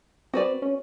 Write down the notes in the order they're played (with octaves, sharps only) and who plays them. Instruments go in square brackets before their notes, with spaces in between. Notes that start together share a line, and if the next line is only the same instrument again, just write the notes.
[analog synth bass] C4 [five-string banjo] F#4 B4 D5
[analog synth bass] C#4